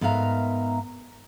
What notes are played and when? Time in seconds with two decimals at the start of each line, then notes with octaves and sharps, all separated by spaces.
0.01 G#2 B3 A#4 E5 F5 A#5